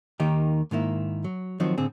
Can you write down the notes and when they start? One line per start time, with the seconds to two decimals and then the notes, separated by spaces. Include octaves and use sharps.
0.20 D#2 D#3 A#3 D#4 G4
0.71 G#2 D#3 A#3 E4
1.24 F#3
1.60 D#3 F3 F#3 C4 D#4
1.78 A2 D3 C4 G#4